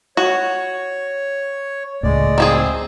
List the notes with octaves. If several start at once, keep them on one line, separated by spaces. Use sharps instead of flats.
F#4 C#5
C#2 A2 G#3 D5
D#3 C4 G#4